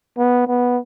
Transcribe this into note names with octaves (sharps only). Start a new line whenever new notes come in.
B3
B3